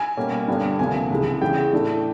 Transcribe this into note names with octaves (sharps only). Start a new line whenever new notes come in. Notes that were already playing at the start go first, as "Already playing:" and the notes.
Already playing: G#5
B2 G3 A#3 C#4
G2 D3 G3 B3 D4
D2 C3 F3 A#3 G#5
C#2 C3 E3 G#3
E2 C#3 E3 G#3 G5
A2 E3 A3 D4